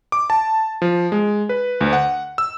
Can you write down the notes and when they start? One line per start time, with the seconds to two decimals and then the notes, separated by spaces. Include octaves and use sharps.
0.12 D6
0.30 A5
0.82 F3
1.12 G#3
1.49 B4
1.81 D2
1.93 F#5
2.38 E6